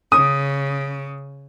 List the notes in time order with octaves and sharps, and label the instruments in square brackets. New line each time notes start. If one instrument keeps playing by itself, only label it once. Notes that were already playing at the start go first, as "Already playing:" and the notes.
[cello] C#3 [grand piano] D#6